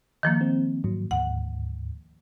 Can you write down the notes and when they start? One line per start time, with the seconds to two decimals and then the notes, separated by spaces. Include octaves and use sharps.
0.23 D#3 F3 A#3
0.41 C4
0.84 G#2 F#3
1.11 D2 G#2 F#5